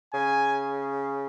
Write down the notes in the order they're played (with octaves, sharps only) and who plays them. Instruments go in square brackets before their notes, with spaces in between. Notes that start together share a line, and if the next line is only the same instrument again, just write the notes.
[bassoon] C#3 [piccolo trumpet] G#5